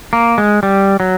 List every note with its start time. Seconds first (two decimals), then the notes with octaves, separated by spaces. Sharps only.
0.13 A#3
0.38 G#3
0.63 G3
1.00 F#3